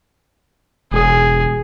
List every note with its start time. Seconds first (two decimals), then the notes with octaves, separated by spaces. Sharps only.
0.92 E1 G#4